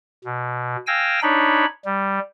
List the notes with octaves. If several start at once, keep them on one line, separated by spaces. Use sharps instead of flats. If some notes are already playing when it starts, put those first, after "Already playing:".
B2
F5 G5 G#5 E6 A#6
D4 D#4 C#5 B5
G3